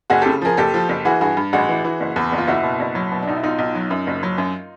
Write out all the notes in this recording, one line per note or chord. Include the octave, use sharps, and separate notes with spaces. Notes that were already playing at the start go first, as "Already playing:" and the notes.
F#1 F#4 G#4
C#3 G4 A4
F3 G#4 A#4
F#1 G4 A4
F3
F#1
E3 F#4 G#4
G2 F#4 G#4
G2
A1 F#4 G#4
E3
E3
F#1
E2
F#1
F4
F#1 E4 F#4
B2
F#1
F#3
B2
D4
B1 D#4
E4
B1 D#4 F4
B1
F#3
F#2
F#1
F#3
F#2